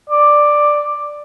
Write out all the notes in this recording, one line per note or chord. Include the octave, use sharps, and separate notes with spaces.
D5